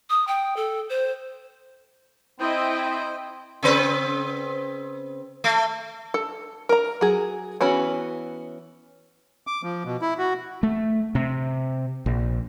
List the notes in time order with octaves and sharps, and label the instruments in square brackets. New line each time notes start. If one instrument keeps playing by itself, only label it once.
[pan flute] D#6
G5
A4
C5
[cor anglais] C4 [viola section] E4 D#5 [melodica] C5 G5
[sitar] C#3 C4 B4
A3
[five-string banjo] A4
A#4 A#5
F#3 G#4
E3 B3 C#4 F#4 B5
[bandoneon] D6
F3
B2
E4
F#4
[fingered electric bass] A3
C3
A#1